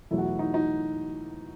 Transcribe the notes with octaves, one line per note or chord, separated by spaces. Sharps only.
E2 B2 F#3 A3 E4
F#4
E4
D#4
D#4